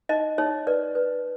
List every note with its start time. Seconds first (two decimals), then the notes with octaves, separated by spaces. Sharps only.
0.09 D#4 D#5
0.38 D#4 C#5
0.67 B4 D5
0.95 B4